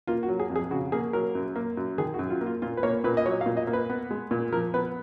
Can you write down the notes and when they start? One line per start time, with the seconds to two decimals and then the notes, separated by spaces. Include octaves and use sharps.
0.07 A#3 F4
0.23 F#4
0.28 F#3
0.40 G#4
0.50 F2
0.56 G#4
0.71 C#3 F#4
0.92 A#3 G#4
1.13 F#3 A#4
1.35 F#2
1.56 A#3
1.77 F#2
1.98 D#3 G#4
2.14 F#4
2.19 F#2
2.30 F4
2.41 A#3
2.46 F4
2.62 A#2 F4
2.77 B4
2.83 A#3 C#5
3.04 A#2 B4
3.17 D#5
3.26 F#3 C#5
3.41 F5
3.46 A#2
3.57 D#5
3.67 A#3
3.73 B4
3.90 B3
4.11 G#3
4.31 A#2
4.52 F3 A#4
4.74 B3 B4